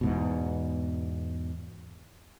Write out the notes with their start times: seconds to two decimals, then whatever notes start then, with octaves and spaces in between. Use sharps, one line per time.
0.01 E2 G#2 B2